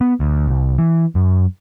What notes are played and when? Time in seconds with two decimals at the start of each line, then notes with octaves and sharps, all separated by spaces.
0.01 B3
0.20 D2
0.47 C2
0.78 E3
1.15 F#2